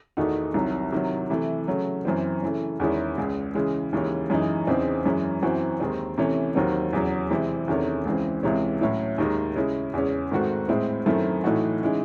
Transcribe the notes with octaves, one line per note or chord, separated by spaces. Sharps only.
E2 D#3 A3 D#4 F#4
C2 C3 D#3 F#3
C3 D#3 F#3
C3 E3 A3
C#3 F#3 A3
F#2 E3 C4
C#3 E3 A3
E2 D#3 G#3 C#4 E4
C#2 C#3 G#3
C#3 E3 G#3
D#2 C#3 E3 G#3 C#4
F#2 E3 G#3 D#4
E2 C#3 E3 C4 D#4
F#2 E3 G#3 C#4
F#2 E3 C4 F#4
D#2 D#3 G#3 C4
C3 E3 A3 C#4
D#2 D#3 F#3 C4
E2 C#3 F#3
C3 E3 G#3 C4
E2 C3 D#3 A3 C#4
C#2 C#3 E3 C4
C#2 C3 E3 G#3 C#4
A2 F#3 C#4 E4
D#2 D#3 G#3
C#3 G#3 C#4 E4
E2 C#3 G#3 C#4
G#2 D#3 A3 C4 F#4
A2 G#3 C4 E4
F#2 D#3 A3 C4 E4
A2 E3 A3 D#4 F#4
C#3 E3 G#3 D#4